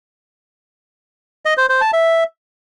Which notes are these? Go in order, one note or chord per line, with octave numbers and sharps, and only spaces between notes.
D#5
C5
C5
A5
E5